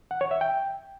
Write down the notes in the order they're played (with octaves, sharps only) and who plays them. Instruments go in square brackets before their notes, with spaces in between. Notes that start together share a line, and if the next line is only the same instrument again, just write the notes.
[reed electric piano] F#5
C#5
E5
G5